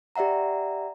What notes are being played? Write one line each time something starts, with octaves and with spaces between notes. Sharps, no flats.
G4 D5 E5 F#5 A#5